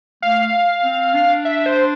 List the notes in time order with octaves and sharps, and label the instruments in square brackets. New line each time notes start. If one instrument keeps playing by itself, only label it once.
[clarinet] A3 [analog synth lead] F5
[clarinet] C4
D4
[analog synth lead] E5
C5